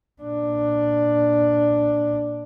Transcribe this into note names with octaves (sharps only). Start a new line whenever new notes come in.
A#2 D4